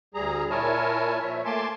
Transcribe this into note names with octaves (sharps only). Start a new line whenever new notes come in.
D2 G3 G#4 A#5
A#2 E4 A#4 C#5 G#5 A5
A#2 F3 C#5 E5
A3 A#3 G#5 A5 C6 D6